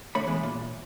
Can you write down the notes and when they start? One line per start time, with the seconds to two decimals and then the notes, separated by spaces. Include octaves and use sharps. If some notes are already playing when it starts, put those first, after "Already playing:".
0.15 D3 A3 C#5 B5
0.27 E3 G#3 B3
0.43 A#2